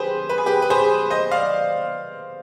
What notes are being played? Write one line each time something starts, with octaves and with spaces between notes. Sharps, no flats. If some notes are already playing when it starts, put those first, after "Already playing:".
Already playing: G4 G#4 B4 C5
B4
G#4
G4 B4
B4
G#4 C5
C5 D#5
D5 F5